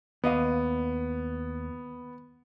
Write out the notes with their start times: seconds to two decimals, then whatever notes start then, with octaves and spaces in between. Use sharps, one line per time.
0.24 D#2 B3 D#5 F5